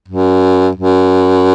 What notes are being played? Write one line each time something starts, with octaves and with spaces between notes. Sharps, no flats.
F#2
F#2